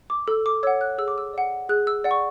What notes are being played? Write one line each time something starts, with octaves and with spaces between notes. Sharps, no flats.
D6
A4 E6
D6
C#5 F#5 E6
F#6
G#4 E6
D6
E6
D5 F#5
G#4 F#6
E6
D5 F#5
C#6